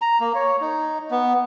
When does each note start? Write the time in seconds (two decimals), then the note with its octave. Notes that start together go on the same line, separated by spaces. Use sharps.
0.02 A#5
0.20 A#3
0.35 C#5
0.61 D#4
1.11 B3